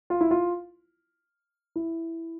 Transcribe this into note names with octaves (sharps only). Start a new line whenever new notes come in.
F4
E4
F4
E4